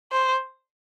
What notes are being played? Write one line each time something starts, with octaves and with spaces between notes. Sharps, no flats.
C5